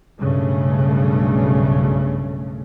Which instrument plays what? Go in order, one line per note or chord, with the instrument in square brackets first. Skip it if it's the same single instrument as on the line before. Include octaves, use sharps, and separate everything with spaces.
[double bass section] B1 G2 C#3 A3